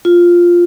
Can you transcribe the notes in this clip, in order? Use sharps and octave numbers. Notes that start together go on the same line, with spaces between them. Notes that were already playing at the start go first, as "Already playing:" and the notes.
F4